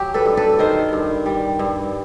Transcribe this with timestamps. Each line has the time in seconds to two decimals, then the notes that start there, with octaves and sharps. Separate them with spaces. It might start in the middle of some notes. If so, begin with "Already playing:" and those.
Already playing: F#3 G4
0.14 A4 B4
0.26 G2
0.37 A4 B4
0.59 D#3 A#4 C5
0.93 G2
1.26 G3
1.59 G2